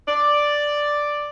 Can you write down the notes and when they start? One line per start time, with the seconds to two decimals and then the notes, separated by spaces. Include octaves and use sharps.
0.08 D5